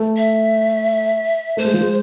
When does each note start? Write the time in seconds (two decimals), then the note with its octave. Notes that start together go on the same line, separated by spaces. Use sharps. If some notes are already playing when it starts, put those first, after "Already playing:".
Already playing: A3
0.17 E5
1.57 A3 C5
1.65 G#3
1.74 F3
1.81 G#3